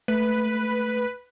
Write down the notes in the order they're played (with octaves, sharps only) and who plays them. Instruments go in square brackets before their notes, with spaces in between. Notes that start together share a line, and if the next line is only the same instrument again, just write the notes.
[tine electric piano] A3 [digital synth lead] B4